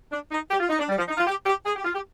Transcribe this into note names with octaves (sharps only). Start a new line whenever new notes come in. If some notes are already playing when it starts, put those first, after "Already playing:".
D4
D#4
G4
F4
D#4
D4
G3
F3
D#4
F4
G4
G4
G#4
G4
F4
G4